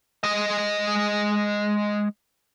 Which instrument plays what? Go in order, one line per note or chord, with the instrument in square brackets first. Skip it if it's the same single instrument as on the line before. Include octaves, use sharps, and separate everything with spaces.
[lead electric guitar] G#3 D#5